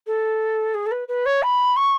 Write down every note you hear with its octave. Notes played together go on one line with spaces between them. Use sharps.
A4
G#4
A4
B4
B4
C#5
B5
C#6